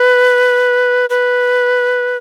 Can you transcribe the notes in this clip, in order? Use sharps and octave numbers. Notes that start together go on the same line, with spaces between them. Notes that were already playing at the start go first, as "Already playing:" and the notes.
Already playing: B4
B4